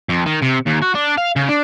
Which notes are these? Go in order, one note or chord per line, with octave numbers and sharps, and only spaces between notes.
F2
D#3
C3
D#2
F#4
D4
F5
C#3
D4